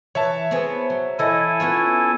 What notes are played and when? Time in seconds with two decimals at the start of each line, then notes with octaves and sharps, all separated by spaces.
0.15 E3 C#5 E5 A5
0.51 B3 C4 G#4
0.90 F#3
1.19 E3 E4 A4 D#5 G#5
1.60 B3 C#4 F4